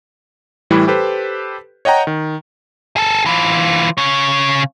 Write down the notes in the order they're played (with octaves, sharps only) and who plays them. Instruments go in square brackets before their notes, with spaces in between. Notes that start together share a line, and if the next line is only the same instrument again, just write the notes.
[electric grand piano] A2 E3 G3 E4
G4 A4 B4 C5
C#5 D#5 F#5 G5 A#5
D#3
[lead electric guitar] G#4 A4
E3 F4
C#3 C#5